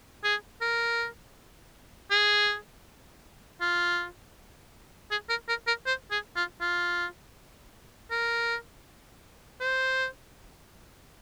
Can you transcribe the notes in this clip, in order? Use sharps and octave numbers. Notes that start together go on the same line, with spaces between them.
G#4
A#4
G#4
F4
G#4
A#4
A#4
A#4
C5
G#4
F4
F4
A#4
C5